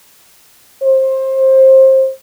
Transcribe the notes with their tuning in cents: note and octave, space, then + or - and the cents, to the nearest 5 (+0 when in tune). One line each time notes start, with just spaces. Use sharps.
C5 +25